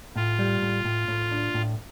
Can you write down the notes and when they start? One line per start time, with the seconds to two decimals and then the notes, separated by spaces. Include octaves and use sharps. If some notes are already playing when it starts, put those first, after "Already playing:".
0.16 A2 F4
0.39 G3
0.62 A2
0.85 A2
1.08 A2
1.31 D4
1.54 A2